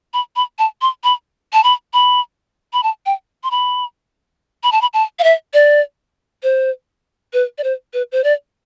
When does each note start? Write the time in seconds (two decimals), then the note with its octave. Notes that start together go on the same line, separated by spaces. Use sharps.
0.14 B5
0.36 B5
0.59 A5
0.82 C6
1.04 B5
1.53 A5
1.64 B5
1.93 B5
2.73 B5
2.83 A5
3.06 G5
3.43 C6
3.51 B5
4.63 B5
4.72 A5
4.82 B5
4.94 A5
5.19 F5
5.24 E5
5.54 D5
6.43 C5
7.33 B4
7.58 D5
7.64 C5
7.93 B4
8.12 C5
8.24 D5